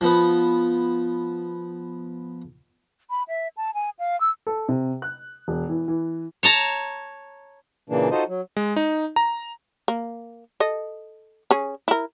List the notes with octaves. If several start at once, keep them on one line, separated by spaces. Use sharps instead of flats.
F3 B3
B5
E5
A5
G#5
F5
E6
A4
C3
F#6
E1
E3
E3
C#5 A5 A#5
A#2 C#3 E3 A#3 D4
D#4 F4 F#4 A4 C5 D#5
F#3
G#3
D#4
A#5
A#3
A4 D#5
C#4 G#4
E4 A#4